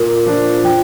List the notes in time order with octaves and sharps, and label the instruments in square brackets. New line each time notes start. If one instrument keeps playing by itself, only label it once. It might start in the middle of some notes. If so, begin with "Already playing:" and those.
Already playing: [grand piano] A#2 [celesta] A#4
[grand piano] F3 D4
[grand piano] F3 [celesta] G5